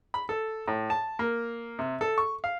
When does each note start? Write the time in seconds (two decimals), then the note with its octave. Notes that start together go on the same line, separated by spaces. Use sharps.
0.14 B5
0.29 A4
0.68 A2
0.90 A5
1.19 A#3
1.79 C3
2.01 A4
2.18 C#6
2.44 F5